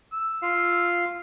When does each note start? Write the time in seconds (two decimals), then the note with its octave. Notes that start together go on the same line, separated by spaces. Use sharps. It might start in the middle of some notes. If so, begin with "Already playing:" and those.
0.13 E6
0.42 F4 F5